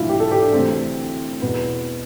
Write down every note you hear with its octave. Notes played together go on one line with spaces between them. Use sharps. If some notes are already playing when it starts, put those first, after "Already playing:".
Already playing: B1 A2 E3 D4 E4 F4
G4
A4
G4
D4
D2 C3 E3 C4
E2 B2 B3